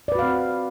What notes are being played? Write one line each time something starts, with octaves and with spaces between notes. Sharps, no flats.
C4 F#4 B4 D5 F5